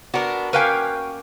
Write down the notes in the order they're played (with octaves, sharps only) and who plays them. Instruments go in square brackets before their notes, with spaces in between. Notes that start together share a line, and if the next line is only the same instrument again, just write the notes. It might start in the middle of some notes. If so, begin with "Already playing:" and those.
[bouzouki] B3 D4 [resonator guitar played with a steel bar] F#4 A#4
[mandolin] A#3 C#4 G5 [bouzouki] B4 F5 G#5